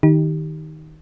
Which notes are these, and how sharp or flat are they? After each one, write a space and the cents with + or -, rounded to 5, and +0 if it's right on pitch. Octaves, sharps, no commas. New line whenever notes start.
D#3 +0 D#4 +10 G4 +0